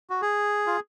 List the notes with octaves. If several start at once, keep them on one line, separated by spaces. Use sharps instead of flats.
F#4
G#4
F4